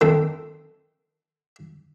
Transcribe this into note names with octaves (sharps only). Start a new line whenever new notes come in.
D#3 C4 A4